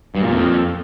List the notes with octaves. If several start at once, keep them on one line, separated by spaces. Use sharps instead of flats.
G2
A#2
F2